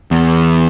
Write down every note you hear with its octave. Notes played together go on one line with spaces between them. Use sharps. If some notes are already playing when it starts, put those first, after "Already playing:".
E2